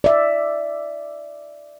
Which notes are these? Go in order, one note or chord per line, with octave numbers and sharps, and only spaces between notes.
D5 E5